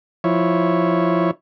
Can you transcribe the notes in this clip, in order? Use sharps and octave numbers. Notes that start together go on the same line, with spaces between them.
F3 E4 C#5